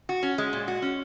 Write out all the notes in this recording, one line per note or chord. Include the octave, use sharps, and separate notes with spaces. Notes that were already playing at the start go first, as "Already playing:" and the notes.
F#4
C#4
G#3
A#2
F#4
C#4